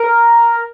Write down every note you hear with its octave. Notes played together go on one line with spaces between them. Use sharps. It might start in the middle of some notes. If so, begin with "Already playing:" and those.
Already playing: A#4